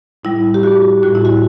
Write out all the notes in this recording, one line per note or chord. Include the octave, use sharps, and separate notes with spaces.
A2 G3 E4
G4
F#4
A2 G3 F#4
E4
F#4